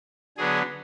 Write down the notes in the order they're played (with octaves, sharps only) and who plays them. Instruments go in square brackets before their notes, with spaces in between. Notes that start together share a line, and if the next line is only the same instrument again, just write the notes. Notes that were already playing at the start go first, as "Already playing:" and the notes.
[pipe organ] D3 F#3 B3 D4 G#4